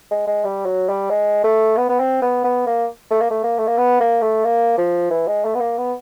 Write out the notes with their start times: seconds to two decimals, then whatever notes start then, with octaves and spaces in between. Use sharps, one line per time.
0.11 G#3
0.27 G#3
0.44 G3
0.66 F#3
0.89 G3
1.10 G#3
1.44 A3
1.77 B3
1.89 B3
2.00 C4
2.22 B3
2.44 B3
2.67 A#3
3.11 A3
3.21 A#3
3.31 A3
3.44 A#3
3.58 A3
3.67 A#3
3.78 B3
4.00 A#3
4.22 A3
4.45 A#3
4.78 F3
5.11 E3
5.27 G#3
5.45 A3
5.55 B3
5.60 A#3
5.78 B3